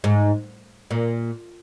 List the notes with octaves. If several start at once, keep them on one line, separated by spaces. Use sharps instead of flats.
G#2
A#2